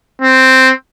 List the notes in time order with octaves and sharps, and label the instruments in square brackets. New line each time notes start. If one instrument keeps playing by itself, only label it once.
[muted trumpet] C4